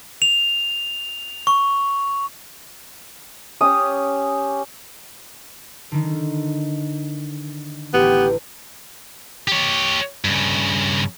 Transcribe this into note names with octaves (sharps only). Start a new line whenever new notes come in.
F7
C#6
C#4 G4 C#5 D#6
D3 D#3
A1 B3 G4
G4 C#5
G2 C#3